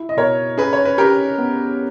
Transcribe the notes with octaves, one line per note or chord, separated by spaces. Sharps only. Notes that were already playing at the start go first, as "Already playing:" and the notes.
Already playing: E4
D#5
B2 A#4 C#5
C#4 G#4 B4
C#5
B4
C#4 G4 A#4
B3